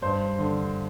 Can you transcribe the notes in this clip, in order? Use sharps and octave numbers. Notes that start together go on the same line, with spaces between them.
G2 C5
D3